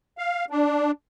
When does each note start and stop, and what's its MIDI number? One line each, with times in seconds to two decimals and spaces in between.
0.18 0.45 77
0.50 0.91 62